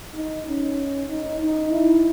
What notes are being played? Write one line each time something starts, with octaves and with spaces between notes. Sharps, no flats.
D#4
C#4
D#4
D#4
E4